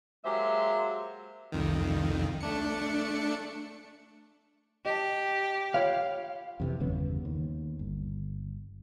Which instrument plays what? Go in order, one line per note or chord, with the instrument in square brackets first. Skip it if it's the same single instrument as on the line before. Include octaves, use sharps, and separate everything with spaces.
[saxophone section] F#3 G#3 A#3 G4 C5 E5
[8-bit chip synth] C2 F2 D#3
A3 D4 C#7
[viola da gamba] G4 [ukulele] D#5 A5
[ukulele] F4 C#5 B5 [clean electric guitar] F5
[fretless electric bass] F2 C3 E3
G1 E2 C#3 B3
D#2
G1